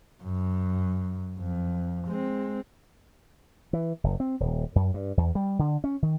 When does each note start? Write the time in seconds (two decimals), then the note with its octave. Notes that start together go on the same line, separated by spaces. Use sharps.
0.23 F#2
1.39 F2
2.07 G#3 C4
3.73 E3
4.04 F#1
4.20 C4
4.40 D#1
4.76 F#2
4.94 G2
5.17 E2
5.35 G3
5.59 D3
5.84 C#4
6.02 D#3